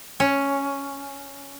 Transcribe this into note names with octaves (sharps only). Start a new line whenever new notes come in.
C#4